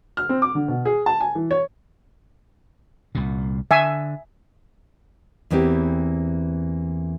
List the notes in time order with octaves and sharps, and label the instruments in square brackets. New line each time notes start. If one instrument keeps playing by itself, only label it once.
[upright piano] F6
C4
D6
D3
B2
G#4
A5
G#5
E3
C#5
[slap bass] C2 A#2
[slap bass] D3 [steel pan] E5 G#5
[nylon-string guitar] E2 E3 A#3 C4 E4 G4